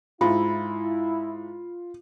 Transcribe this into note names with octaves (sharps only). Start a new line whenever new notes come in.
G#2 E4 F4 B5